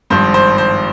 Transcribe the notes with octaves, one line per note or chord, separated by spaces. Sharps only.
G#1 G2 F3 C5
C5
C5